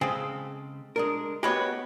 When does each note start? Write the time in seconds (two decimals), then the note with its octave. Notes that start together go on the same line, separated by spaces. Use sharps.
0.01 C#3 G#3 C4 G#4 A4
0.96 G#3 D4 A#4
1.43 G#3 B3 F#4 G4 B4 C#5